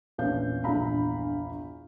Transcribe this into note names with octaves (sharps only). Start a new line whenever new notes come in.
A#1 E2 C#4 B4 F5 G6
A#1 E2 G2 F5 A#5 B5